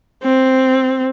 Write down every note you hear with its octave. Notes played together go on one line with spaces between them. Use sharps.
C4